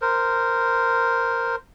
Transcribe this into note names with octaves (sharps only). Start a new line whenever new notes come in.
A#4 C5